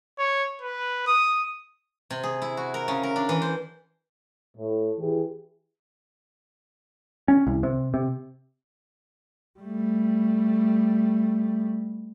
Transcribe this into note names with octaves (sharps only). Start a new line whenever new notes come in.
C#5
B4
D#6
C3
G#4
E4
F#4
A#4
C#3
A#4
D4
E3
C5
A2
E3 G4 G#4
C#4
C2
C3
C3
G3 A3